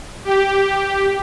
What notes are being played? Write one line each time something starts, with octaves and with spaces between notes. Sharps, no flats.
G4